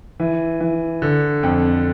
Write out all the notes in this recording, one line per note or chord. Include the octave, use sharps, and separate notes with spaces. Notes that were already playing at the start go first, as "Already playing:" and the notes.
E3
E3
D3
F2